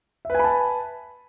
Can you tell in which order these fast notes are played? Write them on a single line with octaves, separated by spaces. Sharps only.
E5 B4 G#5 B5 A5